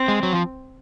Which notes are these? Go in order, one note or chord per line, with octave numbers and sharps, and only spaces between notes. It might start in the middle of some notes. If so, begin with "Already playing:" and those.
Already playing: C4
G#3
F#3
F3